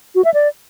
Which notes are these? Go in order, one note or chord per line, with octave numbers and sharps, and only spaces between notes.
F#4
E5
D5